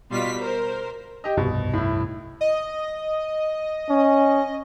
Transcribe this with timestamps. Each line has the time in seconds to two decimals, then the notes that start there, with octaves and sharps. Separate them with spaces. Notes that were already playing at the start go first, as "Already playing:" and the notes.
0.11 B2 G3 F4 C6 B6
0.40 A#4 C5
1.24 G4 D#5
1.37 F1 C2 G2 B2
1.74 A2 E4
2.41 D#5
3.90 C#4